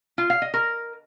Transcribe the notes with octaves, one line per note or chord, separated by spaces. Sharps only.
F4
F5
D#5
A#4